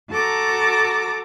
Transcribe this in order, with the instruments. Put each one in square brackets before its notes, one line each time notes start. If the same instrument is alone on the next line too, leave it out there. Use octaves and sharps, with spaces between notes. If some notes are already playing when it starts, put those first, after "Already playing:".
[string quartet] F#4 A4 A5 A#5 D6